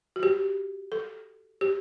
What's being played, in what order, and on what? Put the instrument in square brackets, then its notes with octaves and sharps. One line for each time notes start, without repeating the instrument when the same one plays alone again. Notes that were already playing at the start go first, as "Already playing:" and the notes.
[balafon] F#4
G4
A4
G4